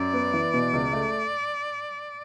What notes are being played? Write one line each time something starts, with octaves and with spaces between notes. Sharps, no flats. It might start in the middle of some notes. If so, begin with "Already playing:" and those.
Already playing: F#2 D5
B3
E3
B2
C#2
A3